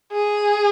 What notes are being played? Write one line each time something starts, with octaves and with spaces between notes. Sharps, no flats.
G#4